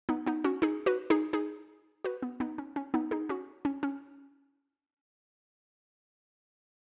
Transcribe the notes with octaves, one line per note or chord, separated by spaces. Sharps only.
B3 D#4
B3 D#4
C#4 F#4
D#4 G#4
F#4 B4
D#4 G#4
D#4 G#4
F#4 B4
B3
B3 D#4
C#4
C#4
B3 D#4
D#4 G#4
C#4 F#4
C#4
C#4